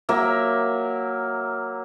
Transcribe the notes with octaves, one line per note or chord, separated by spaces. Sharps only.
F#3 A#3 E5